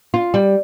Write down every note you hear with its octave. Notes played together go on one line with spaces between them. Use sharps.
F4
G3